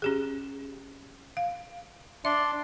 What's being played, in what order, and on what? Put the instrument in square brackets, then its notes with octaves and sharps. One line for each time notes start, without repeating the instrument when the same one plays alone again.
[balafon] C#4 G4 G#4
F5
[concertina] D4 D5 C6 [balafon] E5